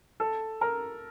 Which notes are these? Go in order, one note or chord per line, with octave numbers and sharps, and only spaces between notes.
A4
A#4